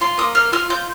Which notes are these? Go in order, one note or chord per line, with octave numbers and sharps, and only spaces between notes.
F4 C6
A#3 D#6
A#3 F6
F4 F6
F4 G6